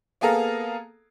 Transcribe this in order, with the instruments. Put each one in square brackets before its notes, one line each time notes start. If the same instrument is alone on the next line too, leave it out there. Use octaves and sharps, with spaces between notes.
[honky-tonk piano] A#3 B3 G#4 A4 F5 A#5